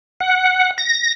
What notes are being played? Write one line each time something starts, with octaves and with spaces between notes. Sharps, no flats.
F#5
A#6